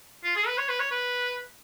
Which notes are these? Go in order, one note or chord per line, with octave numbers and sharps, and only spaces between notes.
F4
G#4
B4
C#5
B4
C#5
B4